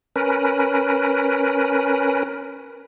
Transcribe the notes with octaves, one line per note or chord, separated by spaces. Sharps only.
C#4 A#4 B4